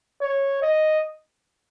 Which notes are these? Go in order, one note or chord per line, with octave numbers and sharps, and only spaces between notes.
C#5
D#5